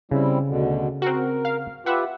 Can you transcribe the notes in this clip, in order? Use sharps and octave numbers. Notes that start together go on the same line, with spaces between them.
C#3 G3 C4 E4
D2 B2 D3
C4 F#4 A#4
F5
F4 G4 B4 E5 F#5